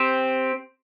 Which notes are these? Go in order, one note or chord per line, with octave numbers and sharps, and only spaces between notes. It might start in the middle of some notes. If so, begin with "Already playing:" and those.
Already playing: C4 G4 C5